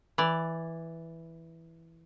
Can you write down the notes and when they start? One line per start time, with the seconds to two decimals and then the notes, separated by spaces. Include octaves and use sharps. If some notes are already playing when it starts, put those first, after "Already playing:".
0.18 E3 D5